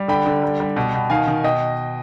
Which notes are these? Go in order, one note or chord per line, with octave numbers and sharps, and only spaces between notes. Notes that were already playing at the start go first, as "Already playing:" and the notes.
Already playing: G3
D3 G5 B5
D3
G3
G3
B2
B2
D#3 F5 G#5
D#3
B2 D#5 G5